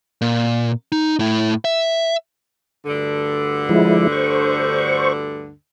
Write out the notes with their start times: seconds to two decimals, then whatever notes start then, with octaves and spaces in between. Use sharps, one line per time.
0.21 A#2
0.92 D#4
1.19 A2 E4
1.65 E5
2.86 D2 G2 D3
3.69 F3 G#3 E4
4.12 C5 C#6